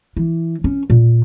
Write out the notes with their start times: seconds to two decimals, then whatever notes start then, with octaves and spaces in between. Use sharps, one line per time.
0.17 E3
0.64 C#4
0.90 A#2